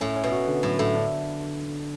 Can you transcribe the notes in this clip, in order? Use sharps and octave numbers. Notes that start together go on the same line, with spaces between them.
A2 C#4
C#4
B2
F#4
D3
A2 F#3
A2 D3
D4